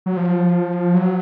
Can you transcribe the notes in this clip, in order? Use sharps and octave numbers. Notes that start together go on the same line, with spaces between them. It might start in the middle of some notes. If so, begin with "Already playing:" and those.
F#3
F3
F#3